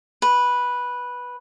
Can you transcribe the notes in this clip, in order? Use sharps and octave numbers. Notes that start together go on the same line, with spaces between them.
B4